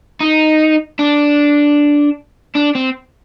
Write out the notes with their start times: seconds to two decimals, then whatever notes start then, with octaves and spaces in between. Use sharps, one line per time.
0.20 D#4
0.99 D4
2.55 D4
2.75 C4